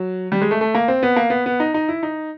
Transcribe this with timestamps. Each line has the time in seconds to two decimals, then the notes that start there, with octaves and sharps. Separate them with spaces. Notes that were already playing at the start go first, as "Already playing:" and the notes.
Already playing: F#3
0.32 G3
0.41 G#3
0.51 A3
0.61 A3
0.75 A#3
0.88 C4
1.03 B3
1.16 A#3
1.30 B3
1.46 B3
1.60 D#4
1.74 D#4
1.89 E4
2.03 D#4